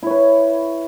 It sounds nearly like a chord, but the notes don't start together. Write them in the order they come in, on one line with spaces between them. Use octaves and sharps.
E4 C#5 B4